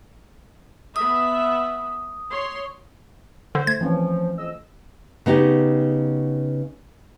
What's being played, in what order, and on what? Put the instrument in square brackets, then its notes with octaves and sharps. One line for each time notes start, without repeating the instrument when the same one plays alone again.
[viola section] B3 E5 [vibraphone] D#6
[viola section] C#5 C6
[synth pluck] D3 [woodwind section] C5
[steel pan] A3 [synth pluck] G#6
[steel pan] E3 C4 C#4 [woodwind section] F3
[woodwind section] F2 D#5 E6
[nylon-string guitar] C#3 B3 D#4 G4